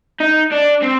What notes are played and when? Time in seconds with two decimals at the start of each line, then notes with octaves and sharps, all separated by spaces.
0.20 D#4
0.52 D4
0.82 C4